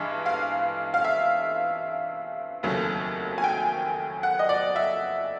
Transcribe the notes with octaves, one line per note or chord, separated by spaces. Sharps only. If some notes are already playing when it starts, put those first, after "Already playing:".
Already playing: G2 E3 G#3
F5
F5
E5
F1 D#2 C#3 F#3 A3
G#5
G5
F#5
D#5
D5
E5